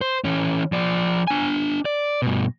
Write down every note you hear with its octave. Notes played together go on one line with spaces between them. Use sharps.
C5
E3 C#4
F3 D5
D4 G#5
D5
G2 B2